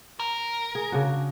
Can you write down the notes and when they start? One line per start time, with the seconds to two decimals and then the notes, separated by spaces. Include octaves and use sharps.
0.20 A#4
0.75 G#4
0.92 C#3 D4 F#4